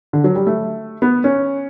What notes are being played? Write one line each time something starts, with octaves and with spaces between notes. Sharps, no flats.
D3
F#3
G3
A3
B3
C#4